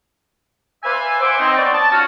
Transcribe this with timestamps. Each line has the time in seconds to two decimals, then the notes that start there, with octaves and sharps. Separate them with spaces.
0.84 B4 C5 D5 E5 F5 G#5
1.22 C5 E5 F#5 D6
1.39 C4 D#4
1.57 B3 C#5 D5
1.74 A5
1.92 C#4 F4 F#4